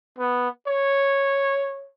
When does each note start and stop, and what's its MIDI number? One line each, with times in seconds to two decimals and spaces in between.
0.18 0.48 59
0.67 1.89 73